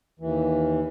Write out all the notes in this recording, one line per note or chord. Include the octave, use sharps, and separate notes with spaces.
D#2 E3